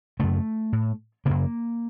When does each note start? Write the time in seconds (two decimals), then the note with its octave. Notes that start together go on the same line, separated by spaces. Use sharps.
0.19 F#2 C#3 A3
0.73 A2
1.25 F#2 C#3 A#3